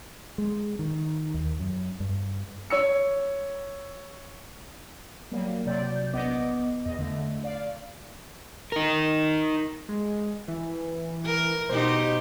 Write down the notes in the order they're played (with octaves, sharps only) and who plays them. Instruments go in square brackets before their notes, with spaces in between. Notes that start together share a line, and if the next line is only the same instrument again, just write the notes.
[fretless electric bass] G#3
D#3
D#2
F#2
G2
[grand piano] C#5 E6 C#7
[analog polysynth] F#3 G3 A#3
C3 F#3 D5 G6
A#1 B3 D#5 D6
E2 D#5
D3 A3
D5 F5
[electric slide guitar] D#4 A#4
[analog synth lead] G#3
E3
[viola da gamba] A#4
[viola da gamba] B2 D#4 G4 [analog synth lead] C5